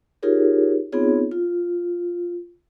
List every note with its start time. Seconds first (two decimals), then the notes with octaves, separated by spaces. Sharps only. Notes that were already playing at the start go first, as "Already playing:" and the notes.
0.23 D#4 F4 G4 G#4 A#4 C#5
0.92 B3 C4 D#4 F4 G#4 C#5
1.31 F4